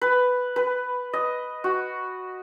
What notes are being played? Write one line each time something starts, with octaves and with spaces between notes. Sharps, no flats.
B4
B4
D#5
F#4